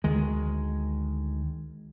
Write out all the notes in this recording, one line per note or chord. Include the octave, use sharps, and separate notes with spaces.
D2 D#3 G#3